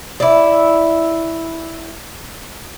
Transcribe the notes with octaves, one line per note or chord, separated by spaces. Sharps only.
E4 D5